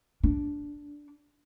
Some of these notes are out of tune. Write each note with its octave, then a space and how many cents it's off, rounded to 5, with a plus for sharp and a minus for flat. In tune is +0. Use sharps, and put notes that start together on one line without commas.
D4 -10